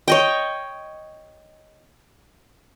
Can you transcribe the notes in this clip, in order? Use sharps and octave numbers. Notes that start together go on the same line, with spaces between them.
C#5 D#5 G5